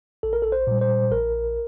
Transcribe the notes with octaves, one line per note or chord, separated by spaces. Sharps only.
A#1 A4
A#4
A4
C5
A#2 G3
C5
A#1 A#4